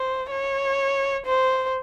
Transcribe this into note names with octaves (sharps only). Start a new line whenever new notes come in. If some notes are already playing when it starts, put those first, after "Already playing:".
Already playing: C5
C#5
C5